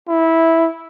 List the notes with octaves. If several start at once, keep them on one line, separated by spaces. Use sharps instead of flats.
E4